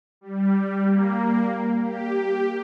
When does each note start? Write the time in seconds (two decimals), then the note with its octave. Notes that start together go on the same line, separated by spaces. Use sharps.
0.21 G3
0.85 A#3
1.80 G4